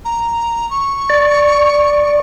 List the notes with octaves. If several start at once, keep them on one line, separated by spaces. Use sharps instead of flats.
A#5
C#6
D5